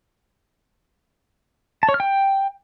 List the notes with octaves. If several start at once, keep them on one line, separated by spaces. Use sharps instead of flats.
A5
C#5
F6
G5